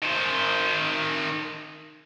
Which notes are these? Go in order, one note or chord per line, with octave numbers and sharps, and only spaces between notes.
D#3 C5